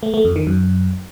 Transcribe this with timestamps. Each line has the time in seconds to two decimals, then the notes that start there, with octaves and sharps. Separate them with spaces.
0.03 A3
0.14 A3
0.25 F2
0.36 D#3
0.47 F#2